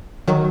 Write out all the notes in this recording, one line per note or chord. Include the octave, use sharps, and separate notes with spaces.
D#3 F#3